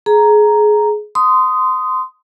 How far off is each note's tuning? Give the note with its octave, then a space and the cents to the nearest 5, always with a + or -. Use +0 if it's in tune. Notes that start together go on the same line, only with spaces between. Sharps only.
G#4 +20 A#5 +0
C6 -20 D#6 +0